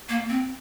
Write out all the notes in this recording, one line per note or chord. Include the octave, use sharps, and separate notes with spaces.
A#3
C4